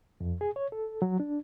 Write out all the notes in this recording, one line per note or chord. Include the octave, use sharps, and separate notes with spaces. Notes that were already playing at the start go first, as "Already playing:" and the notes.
F2
G#4
C#5
A4
F#3
D4